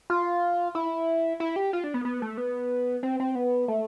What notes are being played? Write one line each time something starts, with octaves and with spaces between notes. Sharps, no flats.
F4
E4
E4
G4
F4
D4
B3
B3
A3
B3
C4
C4
B3
A3